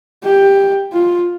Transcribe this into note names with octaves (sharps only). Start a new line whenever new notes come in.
G4
F4